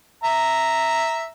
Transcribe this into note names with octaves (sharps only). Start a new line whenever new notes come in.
E5 A#5